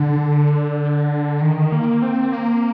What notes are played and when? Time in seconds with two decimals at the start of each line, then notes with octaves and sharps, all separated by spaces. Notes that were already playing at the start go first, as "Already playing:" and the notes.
Already playing: D3
1.42 D#3
1.72 A#3
2.02 C4
2.32 A#3